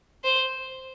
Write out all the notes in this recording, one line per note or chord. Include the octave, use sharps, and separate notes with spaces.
C5